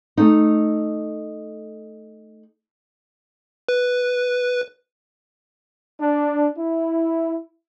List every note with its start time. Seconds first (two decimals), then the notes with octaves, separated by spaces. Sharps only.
0.17 A3 D#4
3.69 B4
6.01 D4
6.58 E4